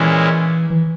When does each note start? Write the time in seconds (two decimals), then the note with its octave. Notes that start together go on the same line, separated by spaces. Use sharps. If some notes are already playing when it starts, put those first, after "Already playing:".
Already playing: A#2 E3 G#3 C#4 E4
0.70 E3